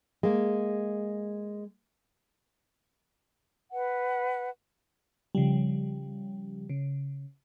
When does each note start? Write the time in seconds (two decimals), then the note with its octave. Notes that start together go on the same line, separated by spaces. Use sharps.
0.23 G#3 A#3
3.71 B4 F#5
5.35 C#3 F3 G3
6.69 C#3